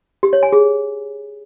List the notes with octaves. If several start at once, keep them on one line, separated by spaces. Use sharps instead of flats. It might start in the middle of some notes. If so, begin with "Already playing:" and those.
G4
C#5
G#5
G#4